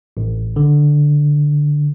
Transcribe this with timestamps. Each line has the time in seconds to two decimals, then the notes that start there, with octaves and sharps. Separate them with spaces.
0.17 A1
0.56 D3